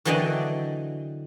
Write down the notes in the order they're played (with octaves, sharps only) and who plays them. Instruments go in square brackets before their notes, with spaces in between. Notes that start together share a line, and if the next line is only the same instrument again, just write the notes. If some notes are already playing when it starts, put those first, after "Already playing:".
[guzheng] D3 E3 F#3 D5 D#5 G5